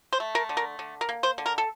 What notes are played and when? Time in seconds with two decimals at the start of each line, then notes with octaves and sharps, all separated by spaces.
0.13 C5
0.20 A3
0.35 A#4
0.49 D3
0.57 A#4
0.79 D3
1.01 A#4
1.09 A#3
1.23 C5
1.38 D3
1.46 A#4
1.58 A4